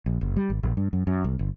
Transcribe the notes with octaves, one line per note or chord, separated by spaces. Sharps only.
A#1
F#1
G3
G#1
A#1
G2
F#2
F#2
C2
G1